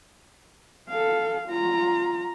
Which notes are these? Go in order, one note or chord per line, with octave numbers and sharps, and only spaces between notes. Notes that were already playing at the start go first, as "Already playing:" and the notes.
A4 F5
F4 A#5